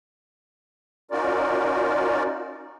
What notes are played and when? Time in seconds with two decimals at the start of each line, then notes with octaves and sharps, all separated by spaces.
1.11 C#4 D#4 F4 F#4 A#4 D5